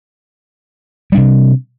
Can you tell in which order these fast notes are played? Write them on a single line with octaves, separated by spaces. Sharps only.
G3 D4 C3